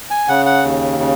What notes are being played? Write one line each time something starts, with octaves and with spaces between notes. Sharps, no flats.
G#5
C#3 F#5
F#5
D#2
C#3